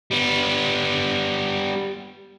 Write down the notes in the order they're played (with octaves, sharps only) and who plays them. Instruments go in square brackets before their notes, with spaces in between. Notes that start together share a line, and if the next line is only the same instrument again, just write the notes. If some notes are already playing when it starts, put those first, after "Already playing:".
[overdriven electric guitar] G3 B3